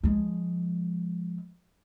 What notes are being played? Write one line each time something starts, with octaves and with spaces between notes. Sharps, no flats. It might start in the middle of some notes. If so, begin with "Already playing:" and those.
F3 G#3